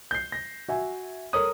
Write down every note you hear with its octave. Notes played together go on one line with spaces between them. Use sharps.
G6 C7
A#6
F#4 E5 G#5
A4 A#4 C#5 D#6